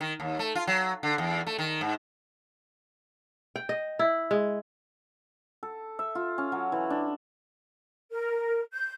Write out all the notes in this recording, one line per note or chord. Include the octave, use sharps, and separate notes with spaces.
D#3
D#2
A3
F4
F#3
D3
E2
A3
D#3
G#2
G5
D#5
E4
G#3
A4
E5
F4
C#4
F#3
E3
D4
A#4
G6